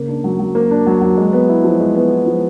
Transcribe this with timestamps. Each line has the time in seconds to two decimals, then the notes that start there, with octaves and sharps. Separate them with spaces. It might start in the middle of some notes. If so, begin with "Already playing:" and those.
Already playing: C#3 A#3
0.08 D4
0.24 F#3
0.39 F#3
0.55 A#3
0.71 D4
0.86 F#3
1.02 F#3
1.18 G#3
1.33 B3
1.49 E4
1.64 F3
1.80 G#3
1.96 B3
2.12 E4
2.26 F3